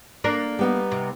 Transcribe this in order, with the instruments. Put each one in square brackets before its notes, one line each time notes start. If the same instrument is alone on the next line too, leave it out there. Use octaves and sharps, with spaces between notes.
[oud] A#3 D4 A#4
[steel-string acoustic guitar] G3 B3 D#4
[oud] C3